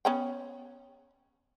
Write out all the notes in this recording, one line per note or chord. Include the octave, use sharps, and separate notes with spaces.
B3 C#4 G5